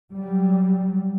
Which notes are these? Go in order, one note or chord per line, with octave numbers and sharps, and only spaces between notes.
F#3 G3